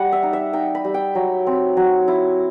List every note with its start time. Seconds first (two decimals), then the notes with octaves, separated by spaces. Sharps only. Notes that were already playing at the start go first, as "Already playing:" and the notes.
Already playing: G3 F#5
0.12 E5
0.23 D#4
0.33 E5
0.53 D#4 G5
0.75 B5
0.85 G3
0.94 G5
1.15 F#3
1.47 C4
1.77 F#3
2.08 E4